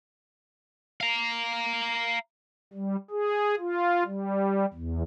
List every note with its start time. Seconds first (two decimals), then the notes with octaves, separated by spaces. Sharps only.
1.01 F5 A#5
2.73 G3
3.11 G#4
3.59 F4
4.05 G3
4.73 E2